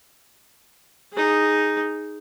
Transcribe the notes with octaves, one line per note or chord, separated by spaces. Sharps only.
D#4 G#4